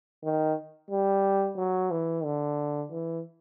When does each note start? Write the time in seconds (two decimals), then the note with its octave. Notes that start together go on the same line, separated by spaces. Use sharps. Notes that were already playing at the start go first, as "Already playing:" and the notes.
0.24 D#3
0.91 G3
1.57 F#3
1.91 E3
2.24 D3
2.91 E3